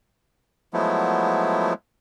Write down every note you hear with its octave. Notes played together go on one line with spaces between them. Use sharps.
F3 F#3 G#3 A3 B3 E4